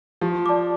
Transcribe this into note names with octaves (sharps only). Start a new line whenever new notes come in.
F3 G4
D5 A5 D6